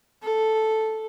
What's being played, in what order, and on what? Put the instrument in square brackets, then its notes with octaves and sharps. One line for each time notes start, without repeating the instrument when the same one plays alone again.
[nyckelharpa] A4